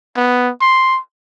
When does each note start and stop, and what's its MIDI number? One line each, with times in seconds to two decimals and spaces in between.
0.17 0.51 59
0.61 0.99 84